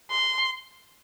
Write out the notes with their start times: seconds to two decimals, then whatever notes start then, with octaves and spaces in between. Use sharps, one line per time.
0.11 C6